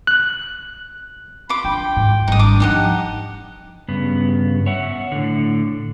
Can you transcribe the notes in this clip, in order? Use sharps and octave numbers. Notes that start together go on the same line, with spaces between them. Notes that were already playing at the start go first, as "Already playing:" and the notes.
F#6
F4 B5 D6
D4 G5
G#2
G#1 G3 D#4 D#6
D4 D6
E3 F3 D#4 G4 F#5
G2 C#3 B3
C#5 E5 F#5
A2 D3